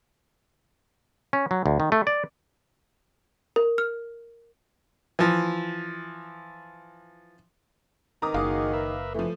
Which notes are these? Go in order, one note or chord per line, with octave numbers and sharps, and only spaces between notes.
C#4
F#3
D2
D#3
A3
D5
A#4
F6
E3 F3
D#3 A#5 D6 D#6
F#1 D#4 F#4 G#4 F5 D6
A#4 B4 E5
E3 F3 A3